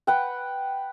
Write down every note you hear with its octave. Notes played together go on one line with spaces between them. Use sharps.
B4 F#5 G5